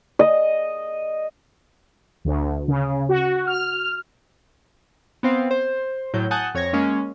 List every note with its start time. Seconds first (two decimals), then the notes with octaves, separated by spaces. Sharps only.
0.19 D#5
2.25 D2
2.68 C#3
3.09 F#4
3.47 F6
5.23 B3 C4 F5
5.51 C5
6.14 A2 F#3 G6
6.31 F#5 G#5 A5 D#6 F#6 G6
6.54 F2 C#5 G#6 A#6
6.73 G#3 A#3 C#4